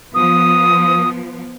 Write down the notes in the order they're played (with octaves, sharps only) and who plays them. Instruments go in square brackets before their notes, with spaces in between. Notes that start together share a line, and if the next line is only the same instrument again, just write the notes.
[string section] F3 B3 [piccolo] D#6